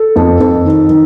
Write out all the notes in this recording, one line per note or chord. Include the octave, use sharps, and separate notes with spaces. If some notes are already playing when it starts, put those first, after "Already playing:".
Already playing: A4
F2
F2
D#3
D#3